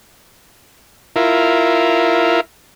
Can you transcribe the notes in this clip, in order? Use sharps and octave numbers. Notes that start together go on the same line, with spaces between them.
E4 F4 A#4